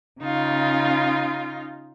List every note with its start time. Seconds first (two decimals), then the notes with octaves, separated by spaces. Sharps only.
0.22 C#3 D#4 F4